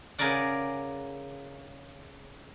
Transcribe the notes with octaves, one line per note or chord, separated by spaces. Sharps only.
C#3 G#4 A#4 B4 D5 F#5